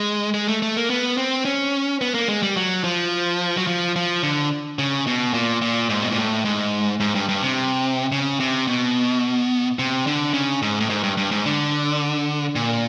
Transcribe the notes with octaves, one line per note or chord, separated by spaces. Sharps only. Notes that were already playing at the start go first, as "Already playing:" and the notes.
Already playing: G#3
G#3
A3
A3
A#3
B3
C4
C#4
B3
A#3
G#3
G3
F#3
F3
F#3
F3
F3
D3
C#3
B2
A#2
A#2
G#2
B2
A#2
A2
G#2
G#2
G2
G2
C3
C#3
C3
B2
C3
D3
C#3
G#2
A2
G#2
G2
G2
G#2
D3
A#2